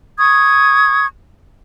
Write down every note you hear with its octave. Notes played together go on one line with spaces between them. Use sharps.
C#6 D#6 G#6